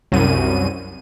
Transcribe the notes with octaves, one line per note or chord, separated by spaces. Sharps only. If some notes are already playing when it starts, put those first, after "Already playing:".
C2 F#2 D#7